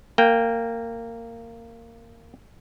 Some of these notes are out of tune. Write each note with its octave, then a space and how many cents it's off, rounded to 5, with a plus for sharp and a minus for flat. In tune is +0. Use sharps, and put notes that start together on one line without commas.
A#3 -20 G5 +0